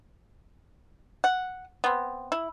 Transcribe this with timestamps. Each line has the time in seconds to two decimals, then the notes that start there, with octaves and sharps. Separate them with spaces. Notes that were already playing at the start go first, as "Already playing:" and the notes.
1.24 F#5
1.84 B3 C4
2.32 E4